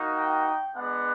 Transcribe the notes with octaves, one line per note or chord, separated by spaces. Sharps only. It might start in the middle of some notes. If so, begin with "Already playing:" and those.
Already playing: A#3 D#4 F#4
G5
G#3 B3 D4 F#5